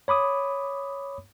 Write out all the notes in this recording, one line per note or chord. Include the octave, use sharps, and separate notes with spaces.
C#5 B5 D6 D#6